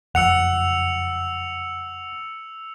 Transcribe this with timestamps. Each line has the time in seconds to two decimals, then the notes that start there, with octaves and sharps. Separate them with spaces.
0.15 F#1 F2 F3 F#5 E6 C#7 F7